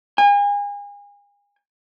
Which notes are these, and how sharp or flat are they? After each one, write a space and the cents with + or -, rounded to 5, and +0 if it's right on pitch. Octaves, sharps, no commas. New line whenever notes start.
G#5 -35